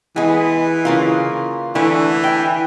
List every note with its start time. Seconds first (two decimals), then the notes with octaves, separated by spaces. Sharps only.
0.16 E3 G#3 B3
0.85 C#3 A#3 F4
1.75 D3 E3 A3
2.24 E5 G5